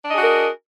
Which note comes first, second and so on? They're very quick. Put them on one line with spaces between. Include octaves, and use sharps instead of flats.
D4 D#5 G#4 F#4 A#4